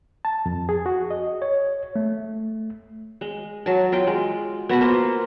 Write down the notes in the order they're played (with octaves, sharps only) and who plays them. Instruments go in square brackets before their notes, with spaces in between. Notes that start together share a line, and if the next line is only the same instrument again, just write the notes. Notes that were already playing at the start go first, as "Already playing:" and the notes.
[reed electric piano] A5
F2
G#4
F#4
D#5
[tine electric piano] C#5
A3
[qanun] G#3
F#3 A5
F#3 F4 G5
G#3
B3 F#4 B4 A5
A#3 F4 C5